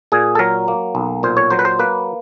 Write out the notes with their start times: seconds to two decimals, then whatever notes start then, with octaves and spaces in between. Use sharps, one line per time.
0.12 A#2 G#4
0.35 A4
0.39 F#3 A#4
0.68 A#3
0.95 B1
1.23 A#2 C5
1.37 C#5
1.50 F#3 C5
1.59 B4
1.65 C5
1.79 A#3 B4